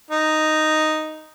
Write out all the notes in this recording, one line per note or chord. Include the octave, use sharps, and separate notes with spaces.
D#4